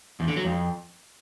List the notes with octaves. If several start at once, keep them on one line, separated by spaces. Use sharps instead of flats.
E2
D3
F#3
F2